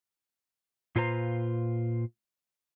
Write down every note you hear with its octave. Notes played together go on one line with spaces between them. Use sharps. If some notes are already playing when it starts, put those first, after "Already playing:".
A#2 F4 B4 C5 A#5